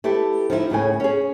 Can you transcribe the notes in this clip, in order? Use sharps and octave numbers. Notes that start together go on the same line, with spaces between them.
E4 G4 A4 B4
F3 D#4 E4
D#2 A2 C#3 G#5
C#4 G#4